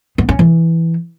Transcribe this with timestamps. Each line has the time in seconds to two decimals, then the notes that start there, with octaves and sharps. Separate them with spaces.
0.18 B3
0.29 C#4
0.39 E3